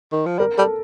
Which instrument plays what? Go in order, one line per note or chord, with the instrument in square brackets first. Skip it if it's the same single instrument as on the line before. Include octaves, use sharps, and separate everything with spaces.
[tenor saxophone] D#3
F3
[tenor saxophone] G3 [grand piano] A#4
[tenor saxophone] G3 [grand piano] A4